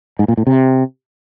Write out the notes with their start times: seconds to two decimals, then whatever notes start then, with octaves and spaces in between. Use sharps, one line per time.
0.19 G#2
0.28 A#2
0.37 A2
0.47 C3